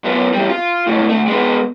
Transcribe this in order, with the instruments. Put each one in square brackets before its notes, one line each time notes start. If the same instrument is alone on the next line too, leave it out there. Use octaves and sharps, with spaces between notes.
[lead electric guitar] F#2 B3
E2 G3
F4
C#2 A2
D3 A3
G#3 B3